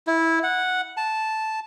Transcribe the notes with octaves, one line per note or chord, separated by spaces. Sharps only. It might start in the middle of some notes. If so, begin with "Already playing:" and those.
E4
F#5
A5